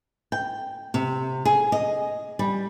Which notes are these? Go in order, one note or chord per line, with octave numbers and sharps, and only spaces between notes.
G5
C3
G#4
D#5
G3